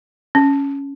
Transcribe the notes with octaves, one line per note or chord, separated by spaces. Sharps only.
C#4